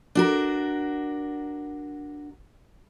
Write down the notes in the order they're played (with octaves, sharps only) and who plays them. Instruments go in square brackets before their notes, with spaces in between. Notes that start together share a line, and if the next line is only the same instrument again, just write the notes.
[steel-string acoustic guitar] D4 F#4 A#4